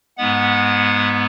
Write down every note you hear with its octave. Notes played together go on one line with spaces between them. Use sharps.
G#2 G#3 B3 F#5